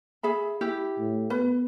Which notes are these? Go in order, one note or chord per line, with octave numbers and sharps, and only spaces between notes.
G#4 E5 B5
E4 G4
A2
B3 B4